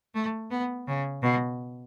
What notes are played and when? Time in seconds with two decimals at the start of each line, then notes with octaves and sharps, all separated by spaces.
0.15 A3
0.51 B3
0.88 C#3
1.23 B2